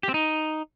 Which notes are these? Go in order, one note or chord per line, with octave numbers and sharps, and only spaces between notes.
G4
C4
D#4